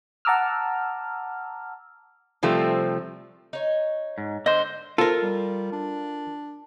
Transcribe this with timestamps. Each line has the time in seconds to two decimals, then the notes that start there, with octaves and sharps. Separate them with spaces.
0.25 F#5 A5 A#5 D6 E6 F6
2.43 C3 F3 G3 A3 C4
3.53 D#4 C#5
4.18 G#2
4.46 D3 C5 D#5
4.98 F4 A4 A#4 C5
5.22 G3
5.72 D4